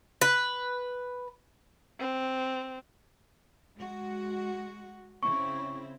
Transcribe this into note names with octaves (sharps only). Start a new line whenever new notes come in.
B4
C4
G#3 F#4
C#3 C4 E4 C#6